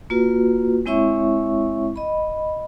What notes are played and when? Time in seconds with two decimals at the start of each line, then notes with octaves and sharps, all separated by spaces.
0.10 A#3 F4 F#4 B4
0.86 G#3 C4 E4 C#5 E5 C#6
1.96 D#5 B5